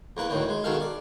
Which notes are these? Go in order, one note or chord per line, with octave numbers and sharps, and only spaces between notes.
E2 A#3 B4
D2 A2 D#3 E3
G#3
B2 D#3 G#4 A4 F5
D5